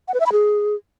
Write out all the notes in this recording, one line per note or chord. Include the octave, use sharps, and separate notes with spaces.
F#5
B4
E5
B5
G#4